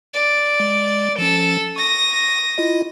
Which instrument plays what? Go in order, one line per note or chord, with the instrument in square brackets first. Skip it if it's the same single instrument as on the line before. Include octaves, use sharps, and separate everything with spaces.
[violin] D5
[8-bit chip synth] G#3
[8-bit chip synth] F3 C#4 [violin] A4 E6
[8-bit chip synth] C#6 [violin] D#6 A#6
[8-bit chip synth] E4 F4 D#5